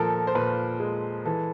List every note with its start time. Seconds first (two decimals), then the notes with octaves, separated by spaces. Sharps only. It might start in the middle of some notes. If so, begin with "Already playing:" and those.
Already playing: A#2 F3 A4 A#4
0.27 C5
0.35 A#2 B4
0.80 G#3
1.25 E3 A4